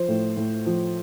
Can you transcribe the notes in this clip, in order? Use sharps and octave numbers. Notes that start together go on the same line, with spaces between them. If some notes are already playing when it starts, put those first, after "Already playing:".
Already playing: F3 C5
A2
A2
F3